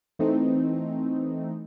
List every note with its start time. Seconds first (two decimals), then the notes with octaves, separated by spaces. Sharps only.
0.19 E3 A3 C4 D#4